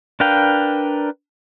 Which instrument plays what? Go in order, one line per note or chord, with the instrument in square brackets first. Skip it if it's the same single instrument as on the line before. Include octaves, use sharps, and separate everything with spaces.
[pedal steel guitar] D4 A#4 B4 F5 G5